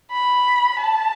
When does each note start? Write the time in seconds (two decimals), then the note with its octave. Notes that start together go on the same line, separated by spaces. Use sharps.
0.12 B5
0.80 A5